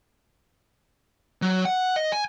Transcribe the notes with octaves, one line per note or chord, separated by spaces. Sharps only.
F#3
F#5
D#5
G#5